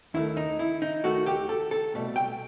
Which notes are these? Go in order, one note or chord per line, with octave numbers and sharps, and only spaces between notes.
D#2 D#3 A3 E4
D#4
E4
D#4
D#2 D#3 A3 F#4
G4
A4
A4
C2 B2 A3
G5